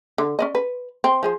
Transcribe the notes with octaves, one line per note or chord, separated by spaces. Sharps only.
D3
C#4 D5 D#5
B4
C4
F3 G#4 C5